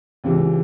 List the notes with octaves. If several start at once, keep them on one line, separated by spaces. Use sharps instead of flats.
C#2 C3 E3